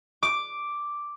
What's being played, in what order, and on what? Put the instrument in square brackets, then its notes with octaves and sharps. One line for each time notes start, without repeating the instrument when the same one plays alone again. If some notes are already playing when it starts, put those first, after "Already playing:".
[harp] D6